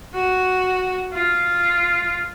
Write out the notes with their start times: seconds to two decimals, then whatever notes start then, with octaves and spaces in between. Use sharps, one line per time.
0.14 F#4
1.13 F4